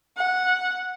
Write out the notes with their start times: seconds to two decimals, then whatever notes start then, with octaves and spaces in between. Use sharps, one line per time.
0.17 F#5